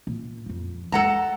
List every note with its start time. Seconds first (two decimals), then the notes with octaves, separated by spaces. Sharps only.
0.07 A#2
0.46 F2 F3
0.92 G#3 A4 F#5 A#5